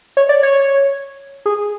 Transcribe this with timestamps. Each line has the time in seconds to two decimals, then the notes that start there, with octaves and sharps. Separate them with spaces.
0.17 C#5
0.29 D5
0.43 C#5
1.46 G#4